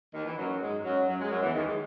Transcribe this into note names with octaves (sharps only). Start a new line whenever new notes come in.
D#2 D#3
E3
F#2 F#3
G#2 G#3
F#2 F#3
F#2 F#3
G#3
F#2 F#3
E2 E3
D#2 D#3
G#3